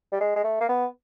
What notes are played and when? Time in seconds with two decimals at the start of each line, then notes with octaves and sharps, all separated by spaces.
0.12 G3
0.21 G#3
0.36 G#3
0.44 A3
0.61 A#3
0.69 B3